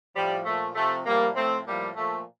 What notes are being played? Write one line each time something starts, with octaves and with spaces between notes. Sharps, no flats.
A2 F3 G3
A#2 F3 A3
C3 F3 A3
A2 F3 G3 A#3
A2 F3 A3 C4
A2 F3 G3 A#3
A#2 F3 A3